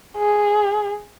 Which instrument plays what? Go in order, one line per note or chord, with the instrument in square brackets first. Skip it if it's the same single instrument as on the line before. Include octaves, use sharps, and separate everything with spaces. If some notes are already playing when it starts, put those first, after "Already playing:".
[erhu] G#4